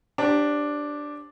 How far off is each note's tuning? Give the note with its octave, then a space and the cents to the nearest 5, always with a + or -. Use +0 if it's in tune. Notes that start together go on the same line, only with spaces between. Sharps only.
D4 +0 G4 +0 C5 +45